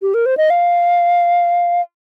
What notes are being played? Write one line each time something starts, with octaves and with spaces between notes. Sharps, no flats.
G4
A#4
C5
D#5
F5